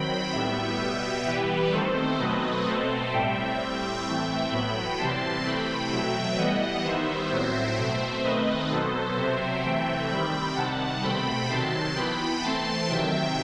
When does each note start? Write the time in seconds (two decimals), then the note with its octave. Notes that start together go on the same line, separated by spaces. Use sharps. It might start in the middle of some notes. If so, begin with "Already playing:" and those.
Already playing: D#3 F#3 C4 G5 B5
0.33 A2 G3 B3 E5 G5
0.80 B2 G3 B3
1.26 E3 G3 B3 G4 B4
1.72 D#3 A3 C4 A4 C5
2.19 B2 F#3 A3 C4 B4 D#5
2.66 B2 A3 C4 A4 C5
3.12 A2 G3 C4 E5 G5
3.59 A2 G3 C4
4.05 E3 A3 C4
4.51 A2 F#3 B3 G5 B5
4.98 C3 E3 G3 C4 A5 C6
5.44 C3 E3 A3 C4 G5 B5
5.91 B2 F#3 A3 E5 G5
6.38 E3 G3 B3 D#5 F#5
6.84 D#3 G3 B3 C5 E5
7.30 A2 F#3 C4
7.78 B2 A3 C4
8.24 D#3 A3 C4 B4 D#5
8.70 B2 F#3 B3 A4 C5
9.16 C3 F#3 C4 C5 E5
9.63 C3 E3 A3 C4 E5 G5
10.09 D#3 G3 C4 G5 B5
10.56 C3 D#3 G3 F#5 A5
11.02 B2 A3 C4 G5 B5
11.49 C3 D#3 F#3 A5 C6
11.96 E3 B3 G5 B5
12.42 E3 A3 C4 A5 C6
12.89 C3 D#3 F#3 E5 G5